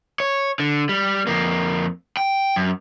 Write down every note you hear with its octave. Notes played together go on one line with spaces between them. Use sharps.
C#5
D3
G3
F2 A#3
G5
F#2